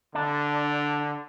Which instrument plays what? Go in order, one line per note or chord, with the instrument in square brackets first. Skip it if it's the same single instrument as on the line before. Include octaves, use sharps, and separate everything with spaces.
[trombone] D3 [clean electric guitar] D4